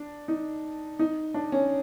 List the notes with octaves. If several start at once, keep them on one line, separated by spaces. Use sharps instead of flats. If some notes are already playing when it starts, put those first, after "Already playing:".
Already playing: D4
D#4
D#4
D4
C#4